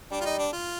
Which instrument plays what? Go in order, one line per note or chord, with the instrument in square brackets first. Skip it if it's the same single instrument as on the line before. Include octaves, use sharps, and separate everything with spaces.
[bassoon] G3 [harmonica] D4
[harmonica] F4
D#4
D4
F4